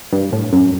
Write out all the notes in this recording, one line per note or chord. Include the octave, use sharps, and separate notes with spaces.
G2
A2
F#2